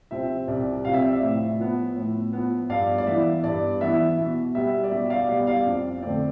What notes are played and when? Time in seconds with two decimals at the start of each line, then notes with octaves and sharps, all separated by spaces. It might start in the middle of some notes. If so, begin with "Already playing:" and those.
0.11 C3 F3 C4 E5
0.48 C2 D5
0.85 C3 F3 C4 F5
0.94 E5
1.03 D5
1.12 E5
1.22 A2
1.59 F3 B3
1.96 A2
2.33 F3 B3
2.70 G2 D5 F5
2.98 D5
3.07 E3 B3 E5
3.44 G2 D5
3.81 E3 B3 E5
4.18 B2
4.55 G3 B3 E5
4.84 D5
4.91 B2 E5
5.10 D5 F5
5.29 G3 B3 D5 F5
5.47 D5 F5
5.66 F2
6.03 D3 A3 C4 D5